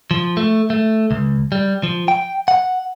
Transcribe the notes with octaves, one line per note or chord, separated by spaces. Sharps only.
F3
A3
A3
C#2
G3
F3
G5
F#5